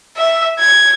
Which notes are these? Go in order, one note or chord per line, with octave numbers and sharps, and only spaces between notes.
E5
G#6